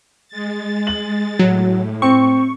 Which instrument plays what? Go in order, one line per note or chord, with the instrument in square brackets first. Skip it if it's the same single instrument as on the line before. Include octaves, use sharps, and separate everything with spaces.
[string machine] G#3 A6
[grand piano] F#7
[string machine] A2 [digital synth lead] F#3
[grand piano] C4 [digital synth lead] C#6